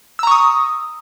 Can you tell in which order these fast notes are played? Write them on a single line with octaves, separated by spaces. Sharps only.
E6 A#5 C#6 D#6